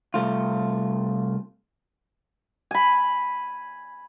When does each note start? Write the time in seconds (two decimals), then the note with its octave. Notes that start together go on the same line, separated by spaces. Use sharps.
0.14 C2 A3 F4
2.71 G#5 B5